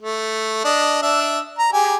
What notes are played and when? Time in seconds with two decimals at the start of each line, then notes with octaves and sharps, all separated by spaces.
0.01 A3
0.65 D4 D#5
1.02 D4 E5
1.59 A#5
1.73 G4 G#4 G#5